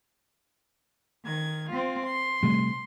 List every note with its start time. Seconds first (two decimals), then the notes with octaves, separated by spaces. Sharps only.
1.25 D#3 G#6
1.69 C4 F4
2.04 C6
2.43 C3 G3 A3